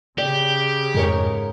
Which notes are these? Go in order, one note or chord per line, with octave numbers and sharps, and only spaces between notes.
C#3 G4 D5
F2 G#2 A#4 C#5